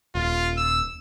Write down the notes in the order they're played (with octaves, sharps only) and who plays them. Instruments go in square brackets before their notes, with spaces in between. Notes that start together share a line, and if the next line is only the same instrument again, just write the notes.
[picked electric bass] D#1 [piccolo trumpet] F4
[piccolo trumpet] E6